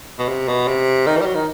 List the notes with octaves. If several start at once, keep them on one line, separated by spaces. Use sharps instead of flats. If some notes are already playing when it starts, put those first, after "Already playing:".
B2
C3
B2
C3
D#3
E3
G3
F#3
D#3